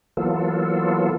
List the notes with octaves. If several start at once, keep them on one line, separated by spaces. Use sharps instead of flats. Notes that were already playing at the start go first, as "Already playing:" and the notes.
E3 F#3 A#3 B3 F4 A4